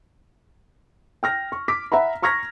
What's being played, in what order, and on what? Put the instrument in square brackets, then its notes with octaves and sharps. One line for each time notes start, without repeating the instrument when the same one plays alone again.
[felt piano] G5 F6 A#6
C#6
D6 B6
E5 F#5 A#5 B5
A#5 C#6 F6 G#6 A#6 B6